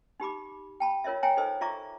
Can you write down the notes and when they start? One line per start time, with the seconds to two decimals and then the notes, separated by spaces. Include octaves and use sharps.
0.20 D#4 G4 B5 D6
0.80 G5 A5 B5
1.04 F4 A#4 C#5 D#5 E5
1.23 C#5 E5 G5 G#5 A#5
1.37 D#4 A4 C5 D#5 E6
1.61 F4 D5 E5 A#5 C#6 D6